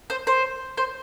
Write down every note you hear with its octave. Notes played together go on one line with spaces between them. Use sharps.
C5
C5
C5